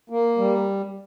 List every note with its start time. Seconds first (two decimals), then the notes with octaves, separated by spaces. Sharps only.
0.10 A#3
0.37 G3